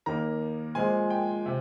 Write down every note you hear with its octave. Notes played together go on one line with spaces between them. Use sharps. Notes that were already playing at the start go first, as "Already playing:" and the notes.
D#2 D#3 A#3 A#5
A#2 F3 G#3 C4 G#5
G5
C3